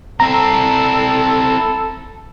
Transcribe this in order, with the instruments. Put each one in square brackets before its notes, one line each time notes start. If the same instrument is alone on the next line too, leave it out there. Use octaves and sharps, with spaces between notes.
[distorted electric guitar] C4 E4 [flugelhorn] A4 [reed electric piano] A#5